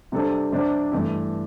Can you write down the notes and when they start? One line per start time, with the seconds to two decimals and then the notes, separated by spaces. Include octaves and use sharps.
0.12 C3 G3 D4 A4 C5
0.52 C3 G3 D4 C5
0.92 G2 E3 A3 E4